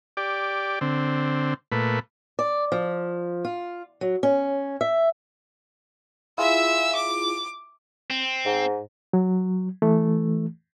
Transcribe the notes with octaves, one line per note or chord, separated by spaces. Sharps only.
G4 D5
D3 C4
A#2 A3 B4
D5
F3
F4
F#3
C#4
E5
E4 F4 G#4 E5 E6
D6
C4
G#2
F#3
E3 A3